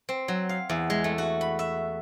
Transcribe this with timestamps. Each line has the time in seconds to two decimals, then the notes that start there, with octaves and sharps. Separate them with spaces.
0.09 C4
0.28 F#3
0.49 F5
0.70 E2
0.90 G#3
1.04 A3
1.18 F#4
1.41 B5
1.59 E5